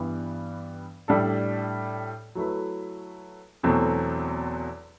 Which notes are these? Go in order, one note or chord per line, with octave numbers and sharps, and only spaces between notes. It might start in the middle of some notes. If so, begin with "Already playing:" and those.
Already playing: G2 E3 G3 B3
A2 G3 D4 A4
F#3 A3 E4 B4
E2 B2 F#3 A3 C4